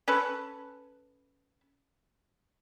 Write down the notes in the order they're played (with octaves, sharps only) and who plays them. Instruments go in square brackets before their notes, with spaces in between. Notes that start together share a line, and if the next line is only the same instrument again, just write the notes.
[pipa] C#4 A4 B4